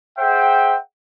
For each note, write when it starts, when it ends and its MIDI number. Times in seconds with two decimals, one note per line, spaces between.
0.18 0.76 68
0.18 0.76 72
0.18 0.76 76
0.18 0.76 78
0.18 0.76 79